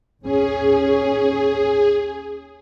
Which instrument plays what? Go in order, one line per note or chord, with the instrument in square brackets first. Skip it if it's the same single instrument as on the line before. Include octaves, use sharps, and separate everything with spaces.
[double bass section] D#2 C#4 [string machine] G#4